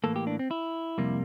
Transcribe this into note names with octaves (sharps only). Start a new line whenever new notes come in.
A2 E3 A#3 A4
G4
D4
C4
E4
F2 C3 G3 A#3